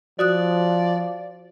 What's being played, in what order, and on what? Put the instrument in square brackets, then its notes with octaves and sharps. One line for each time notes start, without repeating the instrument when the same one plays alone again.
[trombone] F3 [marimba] F#4 D#6 F#6 [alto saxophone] D5